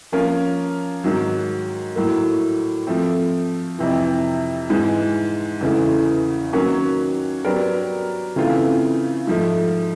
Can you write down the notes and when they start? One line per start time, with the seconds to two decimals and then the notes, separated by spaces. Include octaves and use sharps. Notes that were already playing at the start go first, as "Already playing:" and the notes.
0.12 F3 A#3 C#4 F4 A#4
1.04 G#2 D#3 F#3
1.96 A2 F#3 A#3
2.87 F3 A3 C4
3.79 F2 C3 E3
4.70 G#2 E3 G#3
5.61 E2 C#3 E3 A3
6.53 D#3 F#3 A#3 C#4 F#4
7.45 F#3 B3 D4 G4 A#4
8.36 C#3 E3 A3 C4 F4
9.27 G#2 F3 A3